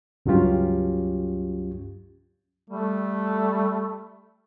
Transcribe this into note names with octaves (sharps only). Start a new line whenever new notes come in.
C#2 G2 F#3 C#4 F4 G4
G3 A3